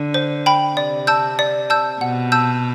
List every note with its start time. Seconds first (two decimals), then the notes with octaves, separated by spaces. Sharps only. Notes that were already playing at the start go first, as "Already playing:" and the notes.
Already playing: D3
0.14 C5
0.46 G5 B5
0.77 C3 D5
1.07 A5 E6 G6
1.39 D5
1.70 A5 E6 G6
2.01 B2 F#5
2.32 A5 E6 G6